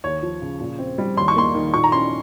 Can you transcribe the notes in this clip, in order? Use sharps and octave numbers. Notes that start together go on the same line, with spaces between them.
D#2 C#5
F3
C#3
A#2
C4
G3
D#2 C6
C#6
A#3 C6
D#3
A#2 C#6
A#5
C#4 C6